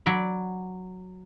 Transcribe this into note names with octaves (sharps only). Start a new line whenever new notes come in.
F#3 D5 B5